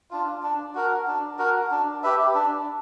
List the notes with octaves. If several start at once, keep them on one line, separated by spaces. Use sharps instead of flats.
D4 F4
D4
F#4 A#4
D4
F#4 A#4
D4
G4 B4 E5
D4